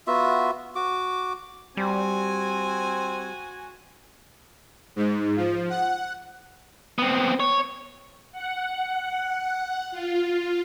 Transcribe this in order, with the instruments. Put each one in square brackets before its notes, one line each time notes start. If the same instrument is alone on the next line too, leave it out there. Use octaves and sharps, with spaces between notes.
[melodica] B3 F4 F#4 E5
F#4 D6
[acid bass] G3 [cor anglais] C4 [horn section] F#4 G#5
[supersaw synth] G#2
F3
F#5
[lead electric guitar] B3 C4
C#5
[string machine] F#5
F4